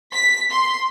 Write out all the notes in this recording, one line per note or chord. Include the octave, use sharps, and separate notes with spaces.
B6
C6